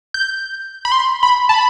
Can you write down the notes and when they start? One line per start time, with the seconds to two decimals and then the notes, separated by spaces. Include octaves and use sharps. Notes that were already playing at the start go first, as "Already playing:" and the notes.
0.14 G6
0.85 B5
0.92 C6
1.23 B5
1.49 A5
1.54 B5